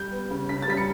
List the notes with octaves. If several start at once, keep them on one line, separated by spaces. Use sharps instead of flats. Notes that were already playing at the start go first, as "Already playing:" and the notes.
Already playing: G3 G6
B3
C#3
C#3 B6
A6
G3 B6
C#7